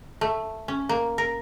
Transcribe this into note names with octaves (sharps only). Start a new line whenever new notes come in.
A3
C#4
A#3
A#4